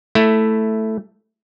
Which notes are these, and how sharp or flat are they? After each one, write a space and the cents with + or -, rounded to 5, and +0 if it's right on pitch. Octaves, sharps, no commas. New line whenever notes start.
A3 +0 E4 +0